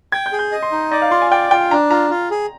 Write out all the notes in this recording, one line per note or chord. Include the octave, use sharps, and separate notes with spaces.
G5 G#6
G6
G#4
G6
D#5
C6
D#4
D5 D#5
F5
F4 C6
G#5
D5 G5
F4 G5
D4 A#5
F4 A#5
F4
G#4